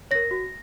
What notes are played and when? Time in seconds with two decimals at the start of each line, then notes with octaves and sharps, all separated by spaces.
0.11 A#4 C#5 A#6
0.31 F#4